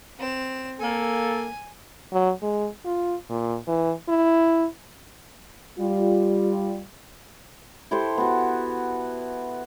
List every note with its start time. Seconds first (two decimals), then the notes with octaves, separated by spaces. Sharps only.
0.19 C4 E7
0.80 A#3 A4 G#5
2.13 F#3
2.43 G#3
2.85 F4
3.30 A#2
3.68 E3
4.09 E4
5.79 G3 F4
7.91 E4 G4 A4 C5
8.18 B3 F#4